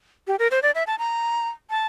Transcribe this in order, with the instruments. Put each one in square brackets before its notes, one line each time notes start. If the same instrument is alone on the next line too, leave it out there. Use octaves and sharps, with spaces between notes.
[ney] G4
A#4
C5
D5
E5
A5
A#5
A5